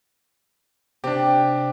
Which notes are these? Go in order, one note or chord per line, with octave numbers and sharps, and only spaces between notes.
C3 D4 G4